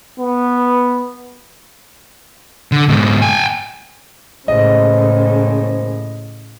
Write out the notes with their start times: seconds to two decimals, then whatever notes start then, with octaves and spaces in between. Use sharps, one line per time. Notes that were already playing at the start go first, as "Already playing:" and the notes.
0.20 B3
2.72 D3
2.89 G#2 B2
3.22 G5 G#5
4.48 D#2 A2 C#3 G#3 C5 D#5